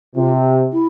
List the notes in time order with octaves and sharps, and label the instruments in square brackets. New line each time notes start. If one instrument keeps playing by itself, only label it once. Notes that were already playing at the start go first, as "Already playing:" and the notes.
[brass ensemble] C3 [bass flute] F4
[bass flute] E4